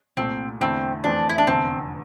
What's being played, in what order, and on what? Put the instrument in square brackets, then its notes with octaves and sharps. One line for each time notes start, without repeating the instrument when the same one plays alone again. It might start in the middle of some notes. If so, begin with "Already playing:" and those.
[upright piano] C2 A#2 A3 [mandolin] C4
[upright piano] E2 D3 A3 E4 [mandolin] C4
[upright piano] F2 E3 A3 C4 [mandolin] D4
[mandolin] E4
D4
[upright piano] F1 E2 D3 [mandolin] C4